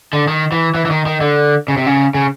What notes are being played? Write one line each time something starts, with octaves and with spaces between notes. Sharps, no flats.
D3
D#3
E3
E3
E3
D#3
D#3
D3
C#3
C3
C#3
C#3